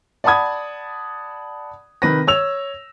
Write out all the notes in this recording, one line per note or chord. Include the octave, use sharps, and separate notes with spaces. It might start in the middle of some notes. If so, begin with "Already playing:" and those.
D5 F#5 A5 B5 D#6 G#6
C3 D#3 B4 A#6
C#5 E6 F7